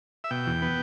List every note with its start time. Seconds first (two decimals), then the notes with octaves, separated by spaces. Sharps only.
0.24 E5
0.31 B2 G5
0.47 E2
0.62 B3